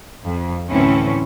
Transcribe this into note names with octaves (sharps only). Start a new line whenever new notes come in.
F2
D2 A2 E3 C4 C#4 E4